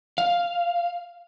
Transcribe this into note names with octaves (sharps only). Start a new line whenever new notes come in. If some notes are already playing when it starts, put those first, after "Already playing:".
F5